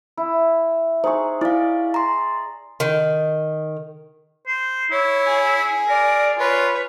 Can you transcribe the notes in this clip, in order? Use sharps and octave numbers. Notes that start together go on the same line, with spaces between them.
E4
D#4 G#4 C5 C#6
E4 D5 F5
A#5 C6
D#3
C5
E4 C#5
G#4 G#5
A#4 D5
F4 B4 C#5